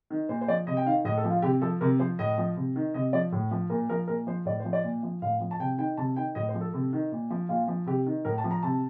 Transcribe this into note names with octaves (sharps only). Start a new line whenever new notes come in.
D#3
A#2 C5
C5
F3 D5
C3 D#5
G5
D#3 F5
A2 D#5
A4
F3
F4
C3 G4
F3 A4
C3 A#4
F3 C5
A2 D#5
F3
C3
D#3
C3 D#5
F3 D5
A2
F3
A#2 A#4
F3 A#4
A#2 A#4
F3 C5
A2 D5
F3 C5
D5
A#2
F3
A2 F5
F3
A5
C3 G5
D#3 G5
C3 A5
D#3 G5
A2 D#5
C5
F3
A4
C3 A4
D#3
A#2
F3
A#2 F4
F3
C3 G4
D#3
A2 A#4
A5
F3
A#5
C3 A5